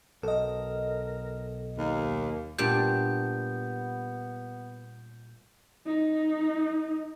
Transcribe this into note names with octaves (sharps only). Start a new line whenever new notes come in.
B1 A4 A#4 D#5
D#2 A#3
A#2 G3 B3 D4 G6
D#4